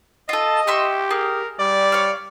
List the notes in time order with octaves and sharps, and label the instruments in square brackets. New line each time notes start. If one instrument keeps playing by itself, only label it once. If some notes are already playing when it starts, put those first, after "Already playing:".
[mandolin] F4 A4 [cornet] D#5
[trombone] G4 [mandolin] E5 C6 C#6
[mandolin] G#4 [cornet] A#4
[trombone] G3 [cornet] D5
[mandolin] C#5 F5